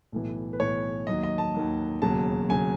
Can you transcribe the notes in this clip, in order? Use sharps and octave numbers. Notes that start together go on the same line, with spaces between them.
B1 A2 E3
B4
B1 A2 E3 C#5
D#2 D#3 F#3 D#5
D#5
A5
D#2 D#3 F#3
E1 D#2 C#3 F#3 A5
C#3 F#3 G#5